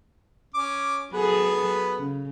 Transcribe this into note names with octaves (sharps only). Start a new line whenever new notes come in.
C#4 D6
F#3 B3 G#4 A4 B4
C#3